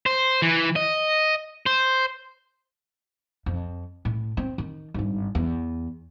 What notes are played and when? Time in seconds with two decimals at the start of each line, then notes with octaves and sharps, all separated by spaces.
0.06 C5
0.42 E3
0.76 D#5
1.66 C5
3.46 F2
4.05 A2
4.37 C4
4.58 D#3
4.94 G#1 G2
5.35 E2